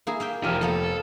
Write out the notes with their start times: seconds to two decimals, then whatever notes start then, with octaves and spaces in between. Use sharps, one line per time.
0.07 A#3 E4 G#4
0.20 A#3 E5 G5
0.44 F1 G4 A#4 A5 F6 D#7
0.61 F3 A#3 B3 A4